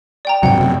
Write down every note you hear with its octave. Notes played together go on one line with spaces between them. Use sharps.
D5 G5 A#5
G#2 C3 F#3 F#5 G5
F#2 C3